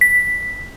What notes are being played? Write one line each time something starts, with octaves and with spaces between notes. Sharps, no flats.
B6